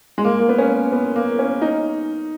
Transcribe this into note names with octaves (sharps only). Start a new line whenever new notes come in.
G#3
A#3
A#3
B3
C#4
B3
A#3
C#4
D#4